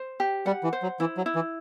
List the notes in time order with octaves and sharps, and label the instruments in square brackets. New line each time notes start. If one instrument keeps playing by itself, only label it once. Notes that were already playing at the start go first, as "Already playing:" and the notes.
Already playing: [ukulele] C5
G4
[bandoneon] G3 [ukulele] F#5
[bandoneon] E3
[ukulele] C5
[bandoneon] F#3
[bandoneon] E3 [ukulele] E4
[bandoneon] F#3
[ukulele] E4
[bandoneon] E3